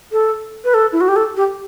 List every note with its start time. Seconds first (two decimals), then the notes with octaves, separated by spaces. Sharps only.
0.12 A4
0.64 B4
0.74 A4
0.92 E4
1.01 F#4
1.08 G4
1.16 A4
1.37 G4